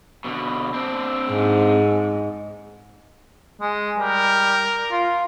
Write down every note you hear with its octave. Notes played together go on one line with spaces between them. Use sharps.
B2 D3
C4 D4
G#2
G#3
G3 A#4
F4